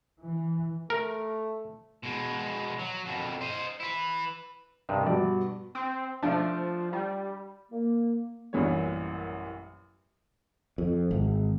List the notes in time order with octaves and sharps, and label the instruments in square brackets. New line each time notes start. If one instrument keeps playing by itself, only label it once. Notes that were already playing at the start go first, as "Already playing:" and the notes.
[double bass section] E3
[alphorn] A3 [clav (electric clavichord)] A#4
[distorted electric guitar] B2 G#3
F#3
F2 B2
C5 D#5
E4 B4
[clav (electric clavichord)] G2 C3 D#3
[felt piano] G2 B2 [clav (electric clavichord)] D5
[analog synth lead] C4
[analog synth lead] F3 [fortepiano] A3 D4
[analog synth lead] G3
[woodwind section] A#3
[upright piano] A1 F#2 A#2 E3 G3 C#5
[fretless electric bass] F2
G#1